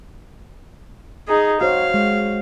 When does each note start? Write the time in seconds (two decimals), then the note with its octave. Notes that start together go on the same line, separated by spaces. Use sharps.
1.28 D#4 G#4
1.61 F#4 C5 C#5 F5
1.94 G#3